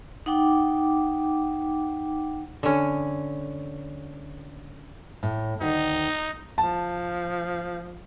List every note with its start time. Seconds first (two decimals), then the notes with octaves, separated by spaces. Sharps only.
0.26 D#4 F#5 G5 D6
2.63 D3 C#4
5.23 A2
5.61 D2 D#3 D#4
6.58 F3 A5